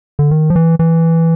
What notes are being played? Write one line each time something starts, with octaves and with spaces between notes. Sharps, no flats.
D3
D#3
F3
E3
E3